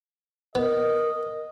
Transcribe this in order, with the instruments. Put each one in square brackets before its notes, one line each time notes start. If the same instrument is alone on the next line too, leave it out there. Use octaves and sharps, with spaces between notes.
[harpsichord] B3 [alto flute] A#4 [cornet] D#5